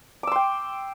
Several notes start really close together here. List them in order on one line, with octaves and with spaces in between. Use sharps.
D6 E6 C6 G5